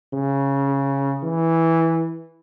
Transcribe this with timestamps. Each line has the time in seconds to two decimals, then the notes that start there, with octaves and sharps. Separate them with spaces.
0.14 C#3
1.23 E3